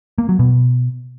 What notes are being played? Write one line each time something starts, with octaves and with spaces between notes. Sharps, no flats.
A#3
F#3
B2